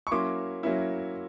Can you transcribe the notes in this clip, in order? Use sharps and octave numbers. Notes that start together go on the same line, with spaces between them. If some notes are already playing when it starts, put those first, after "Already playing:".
C#6
F#3 A#3 C#4 E4 C6 D6
F#3 A#3 C#4 E4